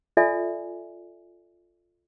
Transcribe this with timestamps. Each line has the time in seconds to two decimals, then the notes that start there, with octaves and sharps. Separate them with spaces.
0.17 F4 A4 D5 E5 G#5